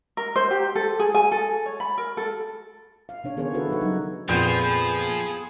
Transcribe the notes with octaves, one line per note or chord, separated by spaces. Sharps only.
A#4
C5
G4
A4
G#4
G#5
A4
C#5
B5
A#4
A4
F5
C#3 D4 C#5
D#3 B3 G#4 A#4 C5 C#5
E4 F#4 A4 B4
C#3 G3 D#4 C#5 F#5
F#3 D#4
F2 A#2 F3 B3 G#4 G5 C6